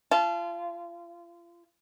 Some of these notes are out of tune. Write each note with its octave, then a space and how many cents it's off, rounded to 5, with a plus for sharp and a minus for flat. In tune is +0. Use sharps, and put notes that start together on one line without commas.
F4 -30 A5 -25